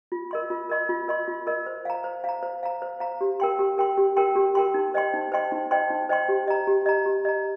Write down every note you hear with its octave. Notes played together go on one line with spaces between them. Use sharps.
F4
A#4 D#5 C6
F4
A#4 D#5 C6
F4
A#4 D#5 C6
F4
A#4 D#5 C6
C5
F5 A#5
C5
F5 A#5
C5
F5 A#5
C5
F5 A#5
G4
A#4 G5 C6
G4
A#4 G5 C6
G4
A#4 G5 C6
G4
A#4 G5 C6
D#4
C5 D#5 G5 C6
D#4
C5 D#5 G5 C6
D#4
C5 D#5 G5 C6
D#4
C5 D#5 G5 C6
G4
D#5 A#5
G4
D#5 A#5
G4
D#5 A#5